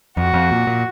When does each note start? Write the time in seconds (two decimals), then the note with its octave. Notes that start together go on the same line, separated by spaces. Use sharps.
0.17 F2 F#4
0.34 F2
0.51 A#2
0.67 A#2